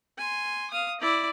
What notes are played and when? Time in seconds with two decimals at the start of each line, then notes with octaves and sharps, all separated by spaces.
0.18 G#5 C6
0.71 F5 D#6
1.01 E4 D5